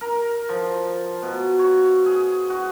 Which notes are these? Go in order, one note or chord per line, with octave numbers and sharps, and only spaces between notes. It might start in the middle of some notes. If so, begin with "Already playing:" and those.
A#4
F3
B2
C#5
G#4
F#4